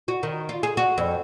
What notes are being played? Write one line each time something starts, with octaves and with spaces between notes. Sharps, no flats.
F#4
D#3
F4
G#4
F#4
F2